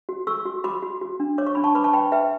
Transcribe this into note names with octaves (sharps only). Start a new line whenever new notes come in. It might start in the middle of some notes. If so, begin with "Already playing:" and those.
F#4
A4 C#6 E6
F#4
F#4 B5 D6
F#4
F#4
D4
C#5 D6
C#6
D4 B5
A5 C#6
B4 B5 D6
A5 C#6
B4 G5 B5
B4 E5 G5